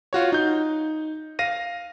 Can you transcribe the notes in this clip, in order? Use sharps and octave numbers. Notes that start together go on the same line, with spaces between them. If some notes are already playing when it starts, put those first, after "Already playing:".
F4 F#4 C#5
D#4 G6
F5 A#6 D#7